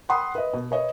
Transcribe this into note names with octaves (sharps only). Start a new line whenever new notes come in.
F#5 G5 B5 C6 D#6
B4 D#5
B2
B4 C#5 D#5